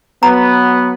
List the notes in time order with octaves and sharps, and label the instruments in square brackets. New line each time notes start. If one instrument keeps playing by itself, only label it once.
[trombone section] F#3 B3 [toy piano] A#5